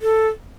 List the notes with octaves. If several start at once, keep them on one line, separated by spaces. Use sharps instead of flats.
A4